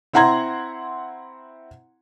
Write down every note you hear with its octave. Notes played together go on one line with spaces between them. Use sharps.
C4 E4 F#5 A#5 C6 G#6